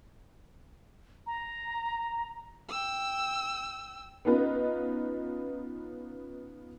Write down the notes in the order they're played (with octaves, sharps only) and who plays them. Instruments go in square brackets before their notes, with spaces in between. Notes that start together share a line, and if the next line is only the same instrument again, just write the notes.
[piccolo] A#5
[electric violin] G5 E6
[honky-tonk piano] B3 C#4 D#4 F4 B4 D#5